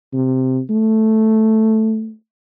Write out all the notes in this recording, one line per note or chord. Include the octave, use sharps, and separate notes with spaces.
C3
A3